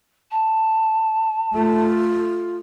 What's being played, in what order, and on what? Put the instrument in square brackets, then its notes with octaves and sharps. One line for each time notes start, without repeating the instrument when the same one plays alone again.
[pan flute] A5
[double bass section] A3 [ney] F4